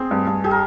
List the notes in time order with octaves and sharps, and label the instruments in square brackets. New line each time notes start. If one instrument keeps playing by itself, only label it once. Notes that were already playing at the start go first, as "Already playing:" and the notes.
Already playing: [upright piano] C4 [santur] G#4 D#5
[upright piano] G2
G2
[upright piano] G4 [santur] G#4
[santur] A#4